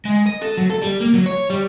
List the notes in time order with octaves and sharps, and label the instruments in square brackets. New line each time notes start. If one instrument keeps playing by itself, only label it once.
[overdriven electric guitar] G#3
D#5
A4
F#3
A4
G3
A#3
F#3
C#5
G3